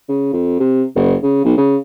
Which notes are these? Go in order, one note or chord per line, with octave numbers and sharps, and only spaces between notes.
C#3
F2
C3
F#1
C#3
B1
C#3